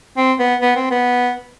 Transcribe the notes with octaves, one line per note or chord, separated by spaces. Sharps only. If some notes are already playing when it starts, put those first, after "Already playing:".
C4
B3
B3
C4
B3